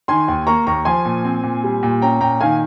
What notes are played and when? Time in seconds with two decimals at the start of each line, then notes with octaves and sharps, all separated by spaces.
0.08 D#3 G#5 C6
0.28 D#2
0.47 A#3 A#5 C#6
0.67 D#2 A#5 C#6
0.85 F3 G#5 C6
1.05 A#2
1.25 C4
1.43 A#2
1.64 G3
1.83 A#2
2.02 C#4 G5 A#5
2.20 A#2 G5 A#5
2.41 D#3 F5 G#5